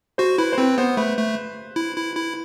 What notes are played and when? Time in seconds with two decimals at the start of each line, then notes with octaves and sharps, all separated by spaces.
0.18 F#4 C5
0.38 E4 B4
0.52 C5
0.58 C4 B4
0.78 B3 C5
0.97 A3 B4
1.17 A3
1.76 E4
1.96 E4
2.15 E4